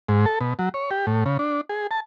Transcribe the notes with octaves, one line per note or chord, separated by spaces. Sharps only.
G#2
A4
B2
F#3
C#5
G4
A2
C#3
D4
G#4
A5